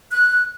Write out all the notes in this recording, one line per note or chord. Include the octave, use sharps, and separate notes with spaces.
F#6